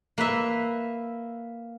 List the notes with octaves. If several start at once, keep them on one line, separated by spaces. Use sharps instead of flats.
A#3 B4 E5